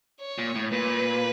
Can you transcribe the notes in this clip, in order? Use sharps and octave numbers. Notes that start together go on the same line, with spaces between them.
C#5
A#2
A2
A#2 B4